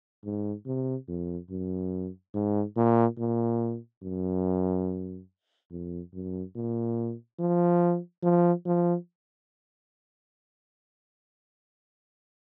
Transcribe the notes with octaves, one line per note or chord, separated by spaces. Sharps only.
G#2
C3
F2
F#2
G#2
A#2
A#2
F#2
F2
F#2
A#2
F3
F3
F3